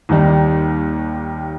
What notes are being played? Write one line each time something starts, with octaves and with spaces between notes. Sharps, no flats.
D#2 D#3 G3